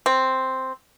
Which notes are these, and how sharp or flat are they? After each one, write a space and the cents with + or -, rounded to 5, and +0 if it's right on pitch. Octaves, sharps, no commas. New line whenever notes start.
C4 +0